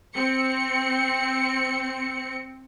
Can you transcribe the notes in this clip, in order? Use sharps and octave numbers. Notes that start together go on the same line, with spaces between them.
C4 C#7